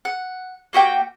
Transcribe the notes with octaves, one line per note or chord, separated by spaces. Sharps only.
F#5
A#3 F#4 G4 G5